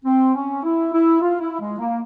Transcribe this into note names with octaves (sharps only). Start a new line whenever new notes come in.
C4
C#4
E4
E4
F4
E4
G#3
A#3